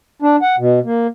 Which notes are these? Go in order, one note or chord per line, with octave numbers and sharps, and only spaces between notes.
D4
F#5
B2
A#3